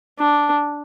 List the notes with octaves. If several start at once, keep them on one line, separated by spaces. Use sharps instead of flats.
D4